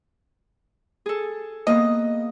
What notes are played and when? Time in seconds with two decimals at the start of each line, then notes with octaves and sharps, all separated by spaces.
1.06 G#4 A4
1.67 A#3 B3 D#5